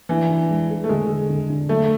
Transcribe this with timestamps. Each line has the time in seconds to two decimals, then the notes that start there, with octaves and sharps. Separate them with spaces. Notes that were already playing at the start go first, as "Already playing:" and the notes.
0.09 E3 D4
0.29 D4
0.50 G#3
0.70 G#4
0.84 A3
0.89 D3 G#3
1.09 G#4
1.30 D3
1.50 D4
1.69 F#3 A3